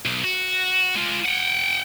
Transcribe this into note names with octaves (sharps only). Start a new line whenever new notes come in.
B1
F#4
G#3 F4
F#5 G5